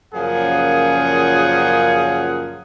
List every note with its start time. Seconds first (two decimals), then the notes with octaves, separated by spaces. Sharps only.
0.13 F#2 A#2 C#3 F3 G#4 F#5